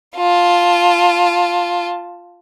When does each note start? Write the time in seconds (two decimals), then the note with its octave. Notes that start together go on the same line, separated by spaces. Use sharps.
0.16 F4 A5